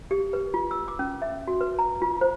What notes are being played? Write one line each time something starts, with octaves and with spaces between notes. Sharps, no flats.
G4
B4
F4
E6
D6
C#4
E5
F#4
B4
A#5
F4
C5